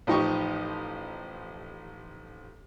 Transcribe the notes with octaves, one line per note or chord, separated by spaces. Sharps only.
A1 F3 D#4 G4 C#6